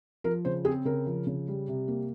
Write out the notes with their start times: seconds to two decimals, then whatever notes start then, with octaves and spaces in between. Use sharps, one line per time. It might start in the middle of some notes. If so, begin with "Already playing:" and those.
0.24 F3 A#4
0.45 C#3 C5
0.65 C4 G#4
0.85 C#3 A#4
1.06 F3
1.27 C#3
1.48 G3
1.68 C3
1.88 A#3